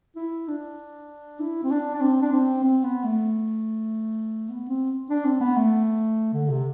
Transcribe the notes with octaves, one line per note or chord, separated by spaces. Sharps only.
E4
D4
E4
C4
D4
D4
C4
D4
C4
C4
B3
A3
B3
C4
D4
C4
B3
A3
D3
C3